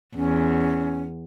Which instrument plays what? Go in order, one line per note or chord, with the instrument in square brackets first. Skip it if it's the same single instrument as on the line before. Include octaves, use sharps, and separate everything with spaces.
[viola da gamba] E2 [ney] C#4